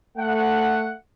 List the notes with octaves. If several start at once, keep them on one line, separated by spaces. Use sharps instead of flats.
A3 F#5